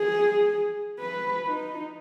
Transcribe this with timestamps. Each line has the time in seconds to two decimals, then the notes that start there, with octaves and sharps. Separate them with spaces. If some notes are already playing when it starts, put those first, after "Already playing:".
Already playing: G#4
0.99 B4
1.46 D#4